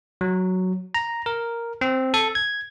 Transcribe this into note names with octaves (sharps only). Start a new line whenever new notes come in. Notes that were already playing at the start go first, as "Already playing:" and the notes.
F#3
A#5
A#4
C4
A4
G#6